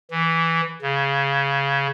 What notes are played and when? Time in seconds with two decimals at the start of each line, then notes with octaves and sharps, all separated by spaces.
0.11 E3
0.82 C#3